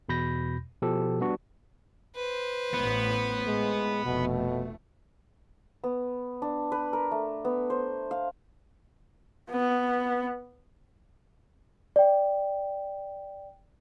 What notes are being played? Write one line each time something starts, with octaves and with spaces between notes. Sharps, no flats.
E2 B2 B5 G6 A#6
B2 F3 G4 A4
G3 B3 D4 F#4
B4 C5
A1 A2 B3
A2 G#3
F1 B2 A3
B3
D4
B4
A#4
A3
B3
C5
F5
B3
D5 G5